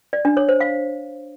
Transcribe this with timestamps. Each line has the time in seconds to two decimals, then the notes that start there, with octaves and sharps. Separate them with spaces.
0.13 D5
0.25 D4
0.37 C#5
0.49 C5
0.60 F5